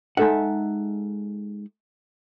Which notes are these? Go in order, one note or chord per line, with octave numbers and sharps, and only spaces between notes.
G#3 D#4 A4 E5 F#5